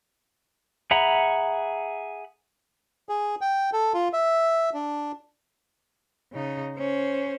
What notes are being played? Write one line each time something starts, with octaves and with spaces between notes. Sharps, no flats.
G#4 E5 F#5 A#5 B5
G#4
G5
A4
F4
E5
D4
C#3 D#4
C#4 C5